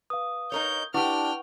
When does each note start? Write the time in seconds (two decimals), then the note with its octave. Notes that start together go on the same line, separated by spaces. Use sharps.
0.10 B4 F5 D#6
0.52 D#4 A#4 C#5 G6
0.94 D4 E4 G4 B4 F#5 G5 C#6 F6